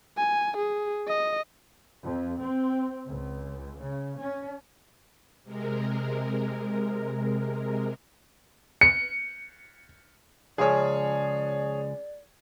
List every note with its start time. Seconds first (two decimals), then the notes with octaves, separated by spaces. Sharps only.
0.18 G#5
0.57 G#4
1.08 D#5
2.02 F2
2.40 C4
3.06 C#2
3.81 C#3
4.18 C#4
5.43 C3 G#3 A#4
8.81 C#7
10.58 C#2 C#3 F3 G#4 C#5 D5